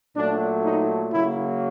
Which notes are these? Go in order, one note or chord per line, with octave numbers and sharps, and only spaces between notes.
A#2 F#3 A3 D4
D#4
C#3 F#3 A#3 E4